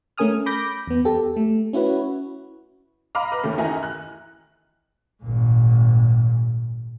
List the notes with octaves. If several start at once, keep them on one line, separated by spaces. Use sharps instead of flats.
A3 C#4 A#4 G#5 D#6 F6
B5 D6 G6 A#6
E2 B3
G4 A4
A3
C#4 E4 F#4 B4 C#5
D#5 F5 A#5 B5 D6 F6
B4
D#2 D#3 A3 C#4
D#3 E3 E4 D#5 G#5 A#5
F#6
G#1 A#2